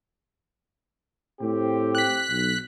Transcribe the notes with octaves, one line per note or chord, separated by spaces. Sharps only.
A2 C4 G4
F#6 B6
B1